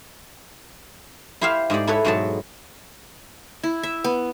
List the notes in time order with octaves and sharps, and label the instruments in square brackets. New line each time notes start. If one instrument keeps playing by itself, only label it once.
[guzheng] E4 G4 C5 E5 F5
G#2 G#3 G4 D5
E4 A4 B4 C#5
G#2 B2 F#3 A4 A5
[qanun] E4
E5
B3